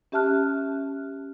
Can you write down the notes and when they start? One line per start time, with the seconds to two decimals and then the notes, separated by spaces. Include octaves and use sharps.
0.12 C#4 G4 E5 A5 F6 F#6